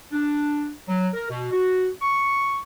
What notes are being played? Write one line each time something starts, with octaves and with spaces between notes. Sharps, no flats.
D4
F#3
A#4
B2
F#4
C#6